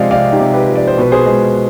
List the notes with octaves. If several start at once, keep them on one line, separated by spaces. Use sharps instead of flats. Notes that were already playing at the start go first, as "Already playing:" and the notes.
Already playing: C3 F3 G#3 D5 D#5 F5
C3 D5 F5
D#4 G4
C3
G4 B4
F3
D5
C5
B2 B4
G#4 C5
G#3